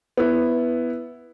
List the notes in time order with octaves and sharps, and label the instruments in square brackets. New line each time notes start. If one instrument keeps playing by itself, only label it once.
[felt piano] B3 E4